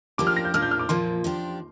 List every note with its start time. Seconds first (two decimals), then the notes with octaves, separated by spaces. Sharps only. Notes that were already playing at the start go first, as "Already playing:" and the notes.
0.18 F3 A#3 D4 G4 D6
0.27 F6
0.37 A#6
0.45 G6
0.54 A#2 A#3 D4 F6
0.62 G6
0.71 F6
0.79 D6
0.89 A#2 F3 A#3 C6
1.24 F3 D4 G4